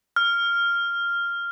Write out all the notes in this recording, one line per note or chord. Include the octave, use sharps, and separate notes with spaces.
F6